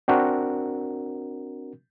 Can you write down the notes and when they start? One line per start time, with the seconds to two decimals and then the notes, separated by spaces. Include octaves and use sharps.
0.08 C4 D4 F#4 A#4